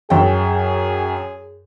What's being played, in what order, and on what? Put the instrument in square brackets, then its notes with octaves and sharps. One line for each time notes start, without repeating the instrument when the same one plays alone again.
[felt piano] F#2 G5 [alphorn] G#4